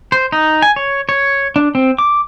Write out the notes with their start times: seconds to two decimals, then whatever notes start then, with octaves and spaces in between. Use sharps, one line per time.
0.12 C5
0.32 D#4
0.62 G#5
0.76 C#5
1.09 C#5
1.56 D4
1.75 C4
1.99 D6